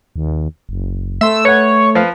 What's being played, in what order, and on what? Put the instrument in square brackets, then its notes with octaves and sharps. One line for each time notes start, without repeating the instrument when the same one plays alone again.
[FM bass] D#2
F#1
[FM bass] A3 [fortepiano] E5 C6 [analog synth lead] E6
[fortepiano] B4 F#5 [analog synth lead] C#5
[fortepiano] F3 B4 F5